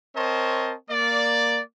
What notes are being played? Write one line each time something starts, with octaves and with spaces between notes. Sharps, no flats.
C4 A#4 C5 C#5 D#5 A5
A#3 D5